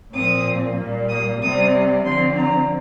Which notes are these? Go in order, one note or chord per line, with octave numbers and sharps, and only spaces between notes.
A#2 F3 C4 D#6
A#2 G3 A#3
D#6
C3 G3 C4 D#6
D3 F3 C4 C6
A#5